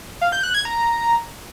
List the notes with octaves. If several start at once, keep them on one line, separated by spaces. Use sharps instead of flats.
F5
G6
F#6
G#6
A#5